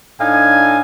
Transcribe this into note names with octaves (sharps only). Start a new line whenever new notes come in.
A2 D4 D#4 F5 G#5